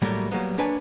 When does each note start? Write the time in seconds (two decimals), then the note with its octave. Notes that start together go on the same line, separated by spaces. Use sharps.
0.02 A2 F#3 G3 A3 A#3
0.31 F#3 G3 A#3 B3
0.58 A#3 D4 B4 C#5 G#5